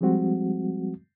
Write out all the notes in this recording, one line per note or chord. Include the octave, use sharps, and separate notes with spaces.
F3 G3 G#3 C4 F#4